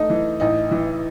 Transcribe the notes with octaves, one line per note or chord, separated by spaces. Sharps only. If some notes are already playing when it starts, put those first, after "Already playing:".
Already playing: A3 D#4
E3
A1 D#4
E3